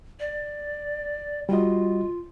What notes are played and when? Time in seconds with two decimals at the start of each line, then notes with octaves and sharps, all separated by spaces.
0.20 D5
1.49 G3 F4 F#4 D#5